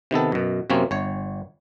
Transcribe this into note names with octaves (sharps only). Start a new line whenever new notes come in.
C3 D#3 B3 A4
F#2 B2
F#2 C3 A#3 C4 C#4 C#5
G1 C#5